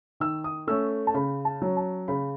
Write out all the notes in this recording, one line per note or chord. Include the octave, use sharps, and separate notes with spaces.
D#3 E6
D#6
A3 C#4 E6
A5
C#3 B5
A5
F#3 C#4
A5
C#3 B5